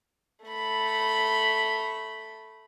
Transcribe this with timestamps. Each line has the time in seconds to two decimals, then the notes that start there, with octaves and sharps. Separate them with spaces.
0.45 A3 B5